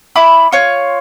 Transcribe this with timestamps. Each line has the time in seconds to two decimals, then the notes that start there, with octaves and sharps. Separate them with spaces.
0.16 E4 B5 D6
0.52 F4 C#5